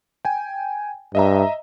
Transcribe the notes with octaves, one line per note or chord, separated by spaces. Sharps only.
G5 G#5
G2 D#5 E5 A#5